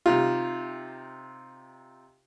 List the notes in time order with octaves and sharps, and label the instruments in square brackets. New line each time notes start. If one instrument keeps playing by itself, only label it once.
[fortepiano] C3 D#4 F4